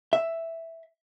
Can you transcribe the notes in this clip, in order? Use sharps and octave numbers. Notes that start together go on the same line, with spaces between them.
E5